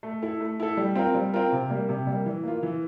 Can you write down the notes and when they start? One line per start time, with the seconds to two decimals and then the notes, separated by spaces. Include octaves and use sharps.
0.03 A3
0.22 E4 A4
0.41 A3
0.60 E4 A4
0.77 G3
0.95 C4 F4 A#4
1.15 G3
1.33 C4 F4 A#4
1.52 C3
1.70 G3 A#3
1.89 C3
2.07 G3 A#3
2.26 E3
2.43 A#3 F4
2.63 E3